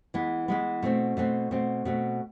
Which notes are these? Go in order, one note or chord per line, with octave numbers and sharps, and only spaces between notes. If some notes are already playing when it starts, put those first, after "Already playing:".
E3 G#3 B3
E3 G#3 B3
B2 A3 C4
B2 A3 C4
B2 A3 C4
B2 A3 C4